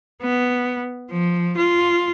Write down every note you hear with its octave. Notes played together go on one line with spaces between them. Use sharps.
B3
F3
F4